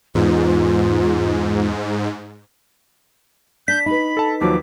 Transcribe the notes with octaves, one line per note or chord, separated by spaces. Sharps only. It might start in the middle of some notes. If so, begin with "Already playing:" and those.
E2 G#2 F4
D4 G6 B6
D#4 B4 B5
A4 A5
D#2 F3 F#3 D6